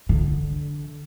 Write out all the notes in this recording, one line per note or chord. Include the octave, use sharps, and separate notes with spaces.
D3